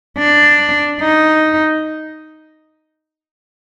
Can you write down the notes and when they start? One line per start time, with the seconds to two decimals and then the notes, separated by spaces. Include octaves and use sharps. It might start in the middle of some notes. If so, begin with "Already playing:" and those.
0.18 D4
1.01 D#4